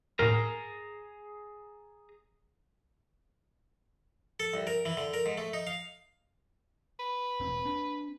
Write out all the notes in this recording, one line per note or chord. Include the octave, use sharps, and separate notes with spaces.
D#2 A2 G#4 A#4 A#5
A4
C2
A#4
E3
D3
A#4
G#2
A3
D#4
F5
B4
E1 C4
C4 D4